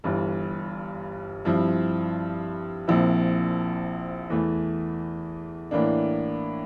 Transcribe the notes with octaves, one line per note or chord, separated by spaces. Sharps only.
G1 G2 E3
G2 F3 C4 E4
A#1 A#2 F3 C4 E4
E2 E3 A3
A2 E3 A#3 D4